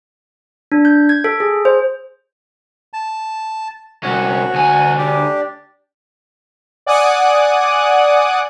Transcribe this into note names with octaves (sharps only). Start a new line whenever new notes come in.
D4
G6
G#6
A4
G#4
C5
A5
C2 C#4 F#4
D2 G#5
D4 G4 D5
D5 F#5 G#5 D6 D#6 F#6